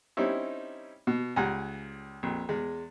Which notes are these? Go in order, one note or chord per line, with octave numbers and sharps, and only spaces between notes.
G3 C4 C#4 D#4 E4
B2
C#2 G3 F#5 G#5 A#5
A#1 F2
E2 G#3